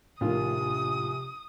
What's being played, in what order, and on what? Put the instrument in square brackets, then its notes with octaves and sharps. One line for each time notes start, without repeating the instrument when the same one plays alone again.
[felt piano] A#1 D#3 [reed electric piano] A2 F4 [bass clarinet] C3 [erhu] D#6